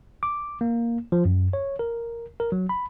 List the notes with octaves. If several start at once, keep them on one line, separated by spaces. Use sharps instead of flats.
D6
A#3
F3
F#2
C#5
A#4
A#4
F#3
B5